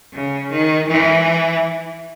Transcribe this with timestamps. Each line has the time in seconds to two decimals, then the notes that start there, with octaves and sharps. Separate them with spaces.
0.13 C#3
0.51 D#3
0.88 E3